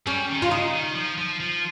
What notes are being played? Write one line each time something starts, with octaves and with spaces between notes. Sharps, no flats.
G3 C#4
D#3
F4
C#3 D#4
D#3
F3
F3
F3